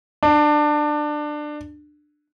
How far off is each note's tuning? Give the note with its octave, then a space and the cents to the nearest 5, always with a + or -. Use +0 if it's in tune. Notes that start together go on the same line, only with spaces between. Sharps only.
D4 +20